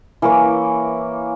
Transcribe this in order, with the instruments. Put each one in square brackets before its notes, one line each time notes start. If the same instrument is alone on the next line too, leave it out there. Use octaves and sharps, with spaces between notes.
[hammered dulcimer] E3 A#3 C#5